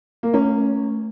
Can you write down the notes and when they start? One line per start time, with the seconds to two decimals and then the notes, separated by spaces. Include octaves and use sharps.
0.23 A#3
0.34 A3 C#4